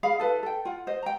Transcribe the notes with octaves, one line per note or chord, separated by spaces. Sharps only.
G#4 F5 B5
E4 A4 B4
A4 G5
F4 F#5
C5 D#5
G5 A#5